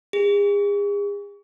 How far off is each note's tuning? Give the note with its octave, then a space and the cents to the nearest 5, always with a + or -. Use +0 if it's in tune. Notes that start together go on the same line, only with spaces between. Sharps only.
G#4 -40